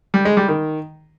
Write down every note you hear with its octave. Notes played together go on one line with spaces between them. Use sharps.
G3
G#3
G3
D#3